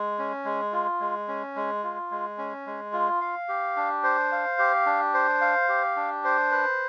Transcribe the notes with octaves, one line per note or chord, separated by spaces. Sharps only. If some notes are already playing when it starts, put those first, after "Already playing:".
Already playing: G#3
C#4
G#3
F4
G#3
C#4
G#3
F4
G#3
C#4
G#3
F4
F5
G4
D4
C5
F5
G4
D4
C5
F5
G4
D4
C5
B4